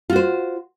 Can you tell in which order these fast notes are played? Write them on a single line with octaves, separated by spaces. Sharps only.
F4 F#4 C5